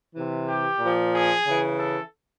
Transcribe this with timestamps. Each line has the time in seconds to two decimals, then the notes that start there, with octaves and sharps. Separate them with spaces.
0.14 C3 E3
0.47 G4
0.79 A#2 F3
1.13 G#4
1.46 C#3 E3
1.78 A4